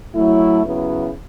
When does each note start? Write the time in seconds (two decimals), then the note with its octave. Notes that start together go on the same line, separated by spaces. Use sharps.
0.14 F#3 A3 E4
0.62 C#3 F#3 B3 E4